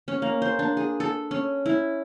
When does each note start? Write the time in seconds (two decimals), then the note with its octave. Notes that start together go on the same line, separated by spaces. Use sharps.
0.08 C#4
0.22 A#3
0.42 C5
0.59 D4
0.77 G#4
1.00 A4
1.31 C#4
1.66 E4